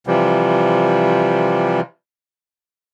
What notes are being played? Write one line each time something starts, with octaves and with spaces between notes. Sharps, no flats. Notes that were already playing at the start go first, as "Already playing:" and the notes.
C3 E3 F3 G3